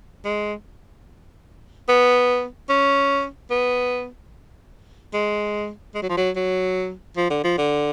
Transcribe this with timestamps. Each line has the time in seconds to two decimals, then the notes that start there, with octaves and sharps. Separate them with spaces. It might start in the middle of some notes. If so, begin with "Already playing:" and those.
0.25 G#3
1.88 B3
2.69 C#4
3.51 B3
5.14 G#3
5.95 G#3
6.02 F#3
6.09 F3
6.17 F#3
6.36 F#3
7.17 F3
7.30 D3
7.44 F3
7.58 D3